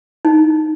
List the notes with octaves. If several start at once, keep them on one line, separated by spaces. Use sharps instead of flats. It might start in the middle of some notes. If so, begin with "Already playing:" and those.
D#4